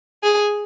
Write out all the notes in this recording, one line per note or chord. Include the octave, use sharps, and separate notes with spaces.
G#4